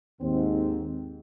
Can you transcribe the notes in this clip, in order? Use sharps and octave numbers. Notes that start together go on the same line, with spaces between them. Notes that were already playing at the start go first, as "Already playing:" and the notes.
D#2 G#2 C4